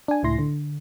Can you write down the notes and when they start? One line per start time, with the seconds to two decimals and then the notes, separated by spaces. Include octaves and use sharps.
0.08 D4 G#5
0.23 C#2 A2 E4 C6 A#6
0.39 D3